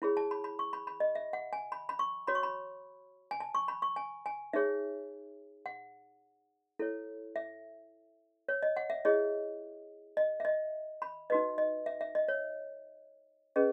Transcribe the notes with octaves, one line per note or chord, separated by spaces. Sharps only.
E4 G#4 C#5 B5
A5
B5
B5
C#6
B5
B5
D#5
E5
F#5
G#5
B5
B5
C#6
F#4 C#5 B5
C#6
B5
G#5
A5
C#6
B5
C#6
G#5
G#5
D#4 G#4 C#5 E5
F#5
E4 A4 C#5
E5
C#5
D#5
F#5
E5
E4 G#4 C#5 D#5
D#5
E5
D#5
B5
D#4 F#4 B4 D#5
D#5
E5
E5
D#5
C#5
C#4 G#4 B4 D#5